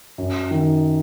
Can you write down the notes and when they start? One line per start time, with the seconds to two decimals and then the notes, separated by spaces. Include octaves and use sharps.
0.18 F#2
0.51 D#3